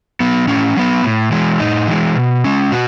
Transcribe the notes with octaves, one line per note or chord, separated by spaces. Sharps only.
F#3 B3
A2 C#4
F#3 B3
A2
E3 G#3
A2 D#4
E3 G#3
B2
G#3 C#4
B2 F#4